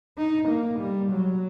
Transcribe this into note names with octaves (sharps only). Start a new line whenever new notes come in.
D#4
A#3
G3
F#3